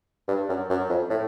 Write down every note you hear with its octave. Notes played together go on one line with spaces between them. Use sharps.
G2
F#2
F#2
F2
A2